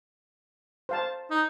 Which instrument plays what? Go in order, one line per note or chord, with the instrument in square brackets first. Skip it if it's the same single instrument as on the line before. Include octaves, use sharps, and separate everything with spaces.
[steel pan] C5 F5 A5
[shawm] D#4